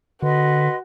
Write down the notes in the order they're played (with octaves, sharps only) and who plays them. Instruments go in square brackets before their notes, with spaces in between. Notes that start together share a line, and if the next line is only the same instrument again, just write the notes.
[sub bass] D3 [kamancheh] F#4 [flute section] B4 D#5 C6